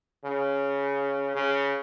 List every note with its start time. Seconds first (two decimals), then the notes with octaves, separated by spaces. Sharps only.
0.25 C#3
1.35 C#3